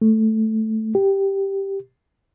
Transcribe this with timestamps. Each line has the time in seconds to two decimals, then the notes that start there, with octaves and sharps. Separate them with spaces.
0.02 A3
0.95 G4